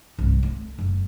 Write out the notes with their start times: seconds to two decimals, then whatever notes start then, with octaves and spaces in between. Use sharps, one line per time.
0.19 C2 G2
0.43 A3
0.79 F#1